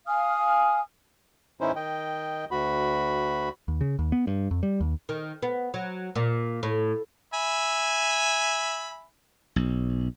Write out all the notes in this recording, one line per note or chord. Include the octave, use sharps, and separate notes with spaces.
F5 G#5 D#6 F6
A2 E3 C#4 D#4 E4 C5
D#3 D#5 G5
D2 F#4 B5
D#2
C#3
D#2
B3
G2
F2
G3
D#2
D#3
B3
F#3
A#2
A2
E5 G#5 B5
B1